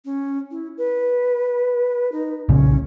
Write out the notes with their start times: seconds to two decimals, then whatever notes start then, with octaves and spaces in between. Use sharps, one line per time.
0.05 C#4
0.51 E4
0.77 B4
2.12 D#4
2.49 B1 A#2 C#3 C#4